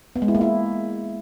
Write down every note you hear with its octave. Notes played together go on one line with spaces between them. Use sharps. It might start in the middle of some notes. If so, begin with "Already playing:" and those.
B3
G#3
E4
A#3
E4